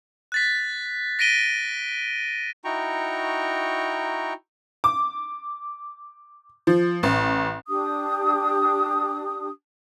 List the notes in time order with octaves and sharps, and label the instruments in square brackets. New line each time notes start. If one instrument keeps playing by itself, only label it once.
[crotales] F#6 A6 B6
A#6 B6 D7 D#7 G7
[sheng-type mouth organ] D#4 E4 F#4 G5 A#5 C#6
[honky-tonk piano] D6
F3
A1
[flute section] D4 G4 D#6